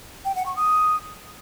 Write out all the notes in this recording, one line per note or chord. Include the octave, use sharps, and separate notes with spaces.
G5
F#5
C#6
D#6